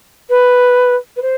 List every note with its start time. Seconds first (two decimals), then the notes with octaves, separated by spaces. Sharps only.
0.29 B4
1.16 B4
1.22 C5